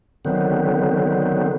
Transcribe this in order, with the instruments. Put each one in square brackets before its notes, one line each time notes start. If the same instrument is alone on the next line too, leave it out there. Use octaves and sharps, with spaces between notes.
[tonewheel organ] D3 D#3 F#3 B3 C4